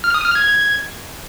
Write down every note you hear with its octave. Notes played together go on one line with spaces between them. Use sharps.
F6
D#6
F6
G#6